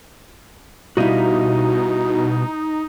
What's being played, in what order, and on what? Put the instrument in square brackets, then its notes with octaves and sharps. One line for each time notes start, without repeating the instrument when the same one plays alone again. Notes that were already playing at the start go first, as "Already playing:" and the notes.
[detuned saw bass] B2 [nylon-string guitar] G3 E4 [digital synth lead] D#4 [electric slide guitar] F#4 D#5 F5